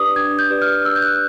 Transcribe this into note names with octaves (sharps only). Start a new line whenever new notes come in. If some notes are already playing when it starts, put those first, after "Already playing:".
Already playing: D4 G4 B4 D5 D6 D#6
D4 G#6
G6
G4 B4 D5
F6
D4 E6
G6
F#6